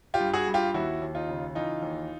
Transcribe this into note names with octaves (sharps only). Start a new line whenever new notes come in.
F4 G4
G2
F#4 G#4
G2
F4 G4
D#2 E4 F#4
D#2
D#4 F4
C#3
E3 D#4 F4
D#2